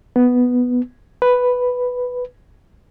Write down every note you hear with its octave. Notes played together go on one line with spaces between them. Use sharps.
B3
B4